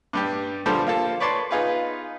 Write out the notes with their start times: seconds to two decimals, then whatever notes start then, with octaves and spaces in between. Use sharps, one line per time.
0.13 G2 G3 G4
0.66 D3 F3 G3 A4 C5
0.87 A#3 F4 A4
1.20 B4 C#5 D5 A5 C6
1.51 B3 D#4 F4 G#4 B4